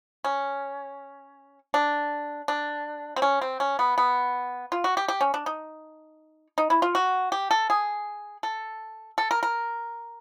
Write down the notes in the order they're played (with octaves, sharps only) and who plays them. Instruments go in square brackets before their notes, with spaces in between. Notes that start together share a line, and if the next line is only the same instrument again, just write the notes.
[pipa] C#4
D4
D4
C4
C#4
C4
C#4
B3
B3
F4
F#4
G4
G4
C#4
D4
D#4
D#4
E4
F4
F#4
G4
A4
G#4
A4
A4
A#4
A#4